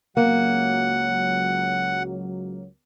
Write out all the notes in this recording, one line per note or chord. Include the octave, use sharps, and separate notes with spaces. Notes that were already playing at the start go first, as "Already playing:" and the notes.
C#2 F#3 A#3 F#5